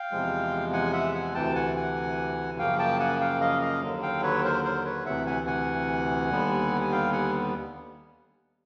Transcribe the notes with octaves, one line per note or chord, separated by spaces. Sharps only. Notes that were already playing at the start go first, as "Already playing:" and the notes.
Already playing: F5 G5
E2 C3 F3 G#3
F#5 G#5
E5 F#5
F#5 G#5
D2 C3 E3 G5 A5
F#5 G#5
F#5 G#5
F#2 C#3 F3 A#3 F5 G5
G5 A5
F#5 G#5
F5 G5
D#5 F5
D#5 F5
D#2 D3 F#3
F5 G5
B4 C#5
A#4 C5
A#4 C5
B4 C#5
D2 C3 E3 E5 F#5
F#5 G#5
F#5 G#5
D#2 D3 G3 B3
G#5
F5 G5
F#5 G#5